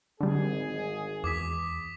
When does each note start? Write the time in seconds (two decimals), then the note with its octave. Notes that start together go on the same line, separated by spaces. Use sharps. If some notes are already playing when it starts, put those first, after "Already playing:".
0.21 G#1 D3 G3 G#4
1.24 E2 D6 D#6 B6